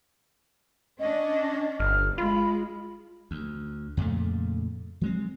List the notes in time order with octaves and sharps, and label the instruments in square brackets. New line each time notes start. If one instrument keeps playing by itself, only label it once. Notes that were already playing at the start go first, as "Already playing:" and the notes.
[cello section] C#4 D4 [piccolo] D#5
[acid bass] G1 [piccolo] F6
[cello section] G#3 [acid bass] F4 [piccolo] B5
[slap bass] D2
F2 A#2 C#3 A3
F#3 G#3 C4